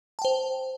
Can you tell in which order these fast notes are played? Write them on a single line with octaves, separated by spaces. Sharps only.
A5 G5 C5